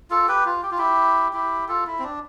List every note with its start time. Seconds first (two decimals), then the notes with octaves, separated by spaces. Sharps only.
0.10 F4 A4
0.28 G4 B4
0.45 F4
0.63 G4
0.71 F4
0.78 E4 G4
1.33 E4 G4
1.68 F4 A4
1.87 E4
1.99 C4
2.04 D4